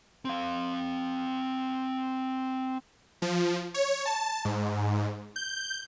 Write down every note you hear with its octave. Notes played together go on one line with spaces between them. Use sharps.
C4 F5
F3
C#5
A5
G#2
G6